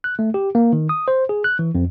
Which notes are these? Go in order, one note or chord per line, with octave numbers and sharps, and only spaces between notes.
F#6
A3
G4
A#3
D#3
D#6
C5
G#4
F#6
E3
F2